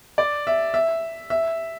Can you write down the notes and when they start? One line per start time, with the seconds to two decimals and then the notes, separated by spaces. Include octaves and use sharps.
0.18 D5
0.47 E5
0.74 E5
1.30 E5